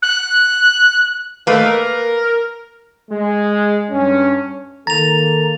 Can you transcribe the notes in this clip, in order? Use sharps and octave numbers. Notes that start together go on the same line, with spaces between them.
F#6
G#2 D#3 A3 A#3 B4
A#4
G#3
G2 C#4
D#3 A#3 A4 A#5 A6 F7